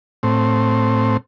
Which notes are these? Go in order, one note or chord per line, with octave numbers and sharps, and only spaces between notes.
A2 C4